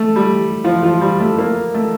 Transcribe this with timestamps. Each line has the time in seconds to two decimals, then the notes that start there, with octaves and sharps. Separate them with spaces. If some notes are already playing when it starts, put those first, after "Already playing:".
Already playing: A3
0.16 G3
0.64 F3
0.83 F3
1.01 G3
1.20 A3
1.38 A#3
1.74 A3